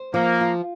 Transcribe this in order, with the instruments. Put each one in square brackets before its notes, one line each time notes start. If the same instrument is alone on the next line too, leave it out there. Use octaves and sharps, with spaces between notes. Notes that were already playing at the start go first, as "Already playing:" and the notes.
Already playing: [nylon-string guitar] C5
[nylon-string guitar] F3 [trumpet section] A#3
[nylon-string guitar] F4